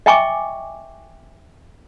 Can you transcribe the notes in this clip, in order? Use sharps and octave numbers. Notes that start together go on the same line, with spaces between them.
D#5 E5 G5 G#5 C#6 D6